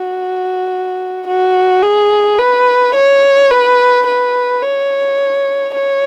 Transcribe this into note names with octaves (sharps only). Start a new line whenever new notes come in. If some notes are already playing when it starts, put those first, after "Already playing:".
Already playing: F#4
F#4
G#4
B4
C#5
B4
B4
C#5
C#5